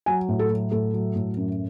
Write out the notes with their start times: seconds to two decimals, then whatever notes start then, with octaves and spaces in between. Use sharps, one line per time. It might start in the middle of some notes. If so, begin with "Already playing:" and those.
0.06 F#3 G#5
0.29 A2
0.39 A4
0.50 F#3
0.71 A2 A4
0.94 F#3
1.15 A2
1.37 F#2